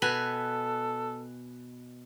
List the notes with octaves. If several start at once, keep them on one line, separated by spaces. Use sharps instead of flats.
B2 A4 B4 G#5